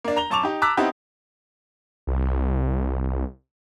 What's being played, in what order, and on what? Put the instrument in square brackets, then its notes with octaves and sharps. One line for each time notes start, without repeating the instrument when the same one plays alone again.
[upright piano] A#3 D4
A#5 F7 G7
F#2 A5 C#6 D6 F7
D#4 G4
A5 A#5 D6 E6 F#6 B6
B3 C4 D#4 E4 G4
[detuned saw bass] C2